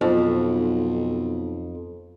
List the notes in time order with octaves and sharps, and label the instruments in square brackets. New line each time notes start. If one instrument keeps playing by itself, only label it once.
[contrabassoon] B1 [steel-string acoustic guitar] F2